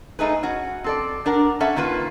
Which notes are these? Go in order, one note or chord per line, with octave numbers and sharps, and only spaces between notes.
A3 D#4 G#4 B4
C#4 F#4
C4 A4 D5
D4 A#4 F#5
C#4 A4 E5 F#5
D#3 A#3 F4 B4